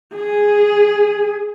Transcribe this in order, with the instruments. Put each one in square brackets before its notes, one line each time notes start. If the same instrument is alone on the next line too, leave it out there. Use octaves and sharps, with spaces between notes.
[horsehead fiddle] G#4